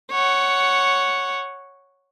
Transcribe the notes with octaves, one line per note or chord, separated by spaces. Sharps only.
C#5 F#5